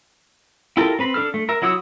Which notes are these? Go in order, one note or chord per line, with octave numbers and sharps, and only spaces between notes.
E4 F4 G4 A4 A#4
C4 B4 B5
D4 A4 F6
A3
A#4 E5
F#3 E4 F#4 D#6 E6